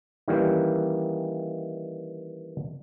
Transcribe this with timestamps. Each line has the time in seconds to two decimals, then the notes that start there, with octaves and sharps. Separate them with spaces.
0.28 D#3 E3 G3 A#3 C#4